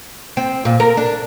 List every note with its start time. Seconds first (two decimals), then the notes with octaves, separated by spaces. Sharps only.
0.37 C4
0.65 A#2
0.80 A#4
0.97 D4